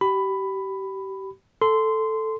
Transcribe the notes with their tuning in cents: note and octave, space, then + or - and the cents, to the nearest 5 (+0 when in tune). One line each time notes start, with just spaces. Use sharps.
G4 -30 B5 +10
A4 +0 C6 -15